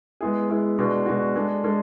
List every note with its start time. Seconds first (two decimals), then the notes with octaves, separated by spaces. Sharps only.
0.21 G#3 B3 E4 G#4
0.50 G#3 B3 E4 G#4
0.78 B2 G#3 D4 F#4
1.06 B2 G#3 D4 F#4
1.36 G#3 D4 A4
1.64 G#3 D4 A4